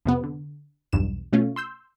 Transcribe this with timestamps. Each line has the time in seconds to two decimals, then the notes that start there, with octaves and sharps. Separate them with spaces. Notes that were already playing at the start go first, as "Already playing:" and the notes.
0.06 F2 C3 B3
0.24 D3
0.93 B1 E2 G2 E7
1.33 B2 A3 C#4 F4
1.56 C6 E6 G6